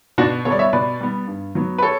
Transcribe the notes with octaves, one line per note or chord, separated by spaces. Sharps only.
B2 D4 F#4
G3 B3 A4 C#5 D5
C#5 E5
B2 B4 D5
G3 B3
G2
F#3 B3
B4
A4 C#5